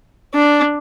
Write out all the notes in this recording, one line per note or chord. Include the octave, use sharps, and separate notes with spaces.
D4